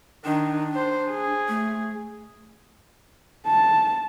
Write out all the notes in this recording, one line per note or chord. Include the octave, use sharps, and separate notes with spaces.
D#3 D4
C5
G#4
A3
A5